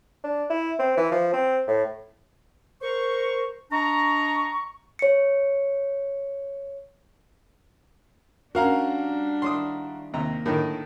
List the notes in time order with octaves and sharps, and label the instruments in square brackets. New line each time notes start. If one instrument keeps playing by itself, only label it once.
[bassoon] D4
E4
C4
E3
F3
C4
A2
[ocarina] A#4 [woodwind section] C5 C#6
[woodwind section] D4 D#5 A#5 [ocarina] C#6
[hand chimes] C#5 C#7
[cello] G3 D4 [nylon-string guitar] C#4 A#4 [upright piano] F#4 F5 A#5
[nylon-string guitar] D#3 E4 [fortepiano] C6 D6 D#6
[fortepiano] D#2 C3 A#5 [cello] A#3
[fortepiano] A2 D3 D#3 [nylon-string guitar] A#4 C#5